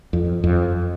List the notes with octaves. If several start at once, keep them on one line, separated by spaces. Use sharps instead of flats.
F2
F2